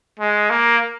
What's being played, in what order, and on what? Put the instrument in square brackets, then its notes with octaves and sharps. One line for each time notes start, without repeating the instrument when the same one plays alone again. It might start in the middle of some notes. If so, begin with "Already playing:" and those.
[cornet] G#3
A#3